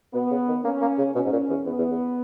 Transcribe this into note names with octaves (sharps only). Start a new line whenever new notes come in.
B2 B3
C#3
D#3
A#3 C#4
A#3
C#3
B2 C#4
G#2
A#2
E2
E2 B3
E2
E2